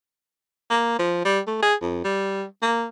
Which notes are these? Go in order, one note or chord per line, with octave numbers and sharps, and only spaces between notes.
A#3
F3
G3
A3
G#4
F2
G3
A#3